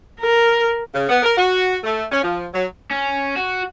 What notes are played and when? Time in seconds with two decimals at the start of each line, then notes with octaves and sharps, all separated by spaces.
0.20 A#4
0.94 C#3
1.09 B3
1.23 A#4
1.37 F#4
1.84 A3
2.12 C#4
2.23 F3
2.54 F#3
2.91 C#4
3.36 F#4